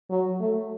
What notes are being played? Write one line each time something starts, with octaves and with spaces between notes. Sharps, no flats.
F#3
A3